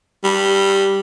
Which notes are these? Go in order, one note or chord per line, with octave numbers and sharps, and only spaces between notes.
G3